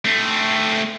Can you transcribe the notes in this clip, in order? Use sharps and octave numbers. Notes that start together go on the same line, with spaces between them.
A3 C4